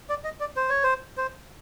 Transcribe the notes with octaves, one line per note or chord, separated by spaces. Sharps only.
D5
D#5
D5
C5
C#5
C5
C5